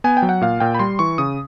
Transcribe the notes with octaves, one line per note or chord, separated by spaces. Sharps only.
B3 G#5
G5
F#3
F#5
A#2 F5
A#2 G5
B5
G3 C6
E3 C#6
C#3 D#6